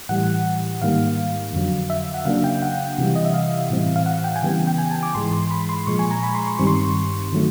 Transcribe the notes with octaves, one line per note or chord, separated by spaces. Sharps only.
A2 E3 G3 F#5
G#2 D#3 G3 A#3 F5
F2 D3 F#3
E5
F#5
C#3 F#3 A#3 D4 F5
G5
F#5
C3 E3 G3
D#5
E5
F5
A2 E3 G3 C4
F5
F#5
G5
G#5
C#3 E3 G3 B3 G5
G5
G#5
A5
D6
G#2 E3 G#3 C6
C6
B5
C6
A#2 F3 G#3 C#6
G#5
A#5
B5
C6
C#6
G2 D#3 G3 C4 C#6
C6
C#6
D#3 F#3 A3